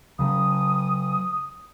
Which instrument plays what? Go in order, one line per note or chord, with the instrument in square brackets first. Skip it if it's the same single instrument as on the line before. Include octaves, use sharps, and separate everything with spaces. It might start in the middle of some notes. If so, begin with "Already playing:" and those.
[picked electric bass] C#3 F#3 [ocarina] D#6